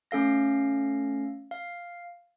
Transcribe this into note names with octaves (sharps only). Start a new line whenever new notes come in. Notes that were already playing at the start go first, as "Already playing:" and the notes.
A3 C#4 A4 F5 A#6
F5